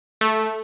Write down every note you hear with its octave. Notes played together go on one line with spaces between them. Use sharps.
A3